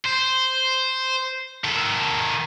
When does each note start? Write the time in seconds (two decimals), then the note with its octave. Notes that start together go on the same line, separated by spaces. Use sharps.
0.05 C5
1.64 D#3 A4